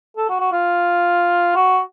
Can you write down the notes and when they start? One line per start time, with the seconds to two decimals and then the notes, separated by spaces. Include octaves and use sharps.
0.17 A4
0.30 F#4
0.40 F#4
0.52 F4
1.56 F#4